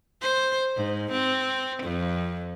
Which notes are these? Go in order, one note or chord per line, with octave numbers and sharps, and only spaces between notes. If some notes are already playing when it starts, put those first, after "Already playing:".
C5
G#2
C4
F2